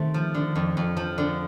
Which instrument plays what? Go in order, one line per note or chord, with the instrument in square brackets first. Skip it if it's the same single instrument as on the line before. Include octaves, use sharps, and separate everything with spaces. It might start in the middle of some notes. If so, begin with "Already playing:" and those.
Already playing: [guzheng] C3 A3 C4 [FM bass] D#3
[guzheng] F3
D3
F2
F2
F3
D3